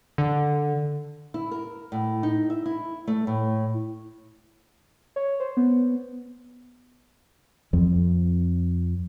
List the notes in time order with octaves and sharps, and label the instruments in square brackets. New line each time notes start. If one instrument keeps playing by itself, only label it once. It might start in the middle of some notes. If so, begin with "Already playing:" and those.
[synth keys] D3
[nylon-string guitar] E4
A#4
A2
D#4
E5
E4
A3
A2
[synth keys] C#5
C5
B3
[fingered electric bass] F2 F3 C4